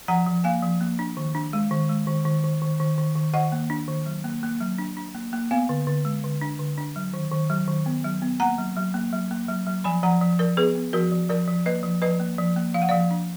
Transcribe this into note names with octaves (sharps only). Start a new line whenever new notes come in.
F3 F#5 A#5
F3
A#3 F5 G#5
F3
A#3
D4
D#3
D4
G#3
D#3
G#3
D#3
D#3
D#3
D#3
D#3
D#3
D#3
D#3 D#5 F#5
A#3
D4
D#3
F#3
A#3
A#3
F#3
D4
D4
A#3
A#3
B3 F5 G#5
D3
D3
G#3
D3
D4
D3
D4
F#3
D#3
D#3
F#3
D#3
B3
F#3
B3
A#3 F#5 A#5
F#3
F#3
A#3
F#3
A#3
F#3
F#3
F3 G#5 B5
F3 F#5 A#5
F3
F3 A#4 D5
B3 G#4 B4
B3
F3 F#4 A#4
F3
F3 A#4 D5
F3
A#3 B4 D#5
F3
F3 B4 D#5
A#3
F3
A#3
F3 F5
F#5
F3 D5 F5
D4